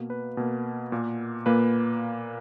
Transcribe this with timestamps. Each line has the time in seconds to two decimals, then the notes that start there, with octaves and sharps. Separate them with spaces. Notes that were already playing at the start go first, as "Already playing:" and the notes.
Already playing: B2 A#3
0.10 B4
0.37 B2 A#3
0.92 A#2 A#3
1.46 A#2 A#3 B4